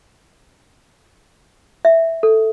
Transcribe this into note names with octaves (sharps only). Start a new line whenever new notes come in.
E5
A4